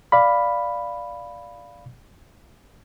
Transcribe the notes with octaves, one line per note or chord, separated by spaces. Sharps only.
D5 F5 B5